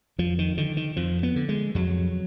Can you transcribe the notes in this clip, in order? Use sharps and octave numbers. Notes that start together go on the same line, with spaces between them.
F2 F3
D#3
D3 D#3
D#3
F2 F3
B3
D3
G#3
F2 F#3